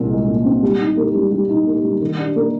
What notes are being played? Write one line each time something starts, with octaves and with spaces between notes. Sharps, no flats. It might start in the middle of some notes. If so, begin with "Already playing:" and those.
Already playing: C2 A#2 C4
G#3
A#2
C4
G3
D#4
A#3
G3
G3
D#4
A#3
G3
D#3
D4
A#3